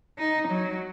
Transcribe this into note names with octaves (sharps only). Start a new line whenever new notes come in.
D#4
F#3